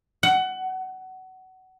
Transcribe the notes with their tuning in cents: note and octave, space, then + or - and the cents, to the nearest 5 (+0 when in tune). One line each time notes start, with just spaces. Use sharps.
F#5 +20